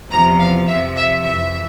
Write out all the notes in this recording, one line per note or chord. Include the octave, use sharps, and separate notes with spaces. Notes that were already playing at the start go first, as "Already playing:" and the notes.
E2 C3 F3 A#5
F5
F2 C3 F3 E5
E5
F2 E3 E5